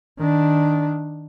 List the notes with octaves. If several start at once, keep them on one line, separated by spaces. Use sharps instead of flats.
D#3 D4